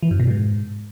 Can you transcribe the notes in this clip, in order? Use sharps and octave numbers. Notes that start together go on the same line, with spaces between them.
E3
F#2
B2
G#2